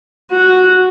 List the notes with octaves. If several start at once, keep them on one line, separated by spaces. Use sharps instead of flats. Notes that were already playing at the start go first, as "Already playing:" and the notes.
F#4